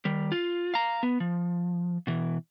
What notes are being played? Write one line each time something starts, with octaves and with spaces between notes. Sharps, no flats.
D#3 G3
F4
F5 A#5
B3
F3
B2 E3